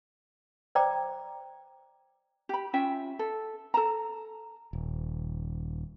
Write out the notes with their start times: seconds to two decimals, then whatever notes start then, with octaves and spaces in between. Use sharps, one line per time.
0.75 C5 D5 G5 A#5 D6
2.49 G4 B5
2.73 C#4 F4 E5 G5
3.19 A4
3.74 A4 A5 A#5
4.73 D#1